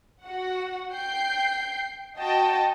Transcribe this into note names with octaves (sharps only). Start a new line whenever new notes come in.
F#4 F#5
G5 G6 C7
F#4 D#5 G5 A5